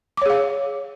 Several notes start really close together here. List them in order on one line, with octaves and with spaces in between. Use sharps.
D6 C#5 G#4 F5